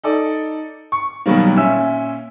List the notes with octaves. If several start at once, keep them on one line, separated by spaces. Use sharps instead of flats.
D#4 A4 D5
C#6
B2 D#3 F#3 G3 A#3
A#2 C#4 E5 E6